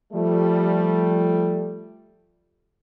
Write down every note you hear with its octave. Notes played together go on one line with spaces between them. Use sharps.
F3 G3 A3